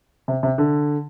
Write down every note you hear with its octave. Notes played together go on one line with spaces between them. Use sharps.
C3
C3
D3